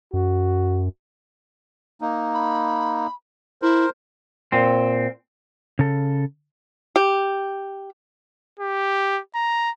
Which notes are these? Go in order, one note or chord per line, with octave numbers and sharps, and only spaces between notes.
F#2 F#4
A#3 D#4
B5
E4 A#4 C5
A#2 C4
C#3 A4
G4
G4
A#5